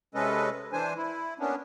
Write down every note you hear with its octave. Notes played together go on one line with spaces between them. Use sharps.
C3 G#3 C#4 A4 B4 D#5
E3 D4 C5 G#5
E4
A#3 B3 C#4 D4